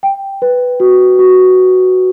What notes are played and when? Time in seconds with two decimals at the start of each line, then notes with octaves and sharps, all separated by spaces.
0.03 G5
0.42 B4
0.80 F#4
1.19 F#4